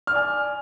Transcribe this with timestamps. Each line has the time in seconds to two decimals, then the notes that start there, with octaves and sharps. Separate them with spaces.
0.07 F6
0.12 D5
0.16 G#5